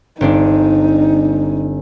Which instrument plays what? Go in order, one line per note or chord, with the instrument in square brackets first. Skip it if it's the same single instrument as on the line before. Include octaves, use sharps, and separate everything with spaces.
[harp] G1 C4 D4 [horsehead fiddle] D#4